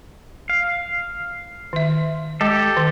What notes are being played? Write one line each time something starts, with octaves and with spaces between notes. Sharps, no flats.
F5
D#3 E5
G#3 G4 A4
D#3